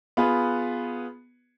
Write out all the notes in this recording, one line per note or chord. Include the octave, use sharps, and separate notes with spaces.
B3 F4 G#4 B4